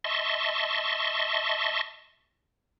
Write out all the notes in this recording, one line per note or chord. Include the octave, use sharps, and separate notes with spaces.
D#5 E5 A5 C6 C#6